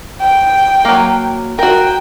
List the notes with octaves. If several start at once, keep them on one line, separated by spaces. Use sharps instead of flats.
G5
F#3 A#3
F#4 A#4 G5